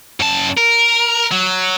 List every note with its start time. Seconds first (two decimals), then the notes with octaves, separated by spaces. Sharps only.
0.20 F#2 A5
0.58 A#4
1.32 F#3